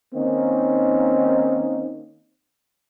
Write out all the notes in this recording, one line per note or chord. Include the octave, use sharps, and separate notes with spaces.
D#3 A#3 C4 C#4 D#4